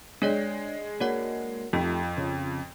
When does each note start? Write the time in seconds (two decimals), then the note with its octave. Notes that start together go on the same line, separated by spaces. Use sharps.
0.22 G#3 D4 C#5 D5
1.00 A#3 D4 F#4 C#5 F#5
1.73 F2 A3 D#4 F4 G4
2.17 C#3